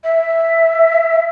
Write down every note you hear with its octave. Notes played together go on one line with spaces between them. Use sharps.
E5